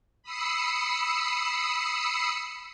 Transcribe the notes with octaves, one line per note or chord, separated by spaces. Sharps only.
B5 D#6 E6 C7 C#7